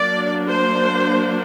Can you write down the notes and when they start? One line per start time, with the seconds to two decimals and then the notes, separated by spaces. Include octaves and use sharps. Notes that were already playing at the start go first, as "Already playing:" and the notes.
Already playing: F#3 A#3 D4 D5
0.49 C5